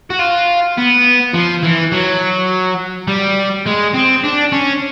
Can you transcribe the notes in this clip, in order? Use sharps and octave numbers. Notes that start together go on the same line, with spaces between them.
F#4
F4
B3
F3
E3
F#3
G3
G#3
C4
D4
C#4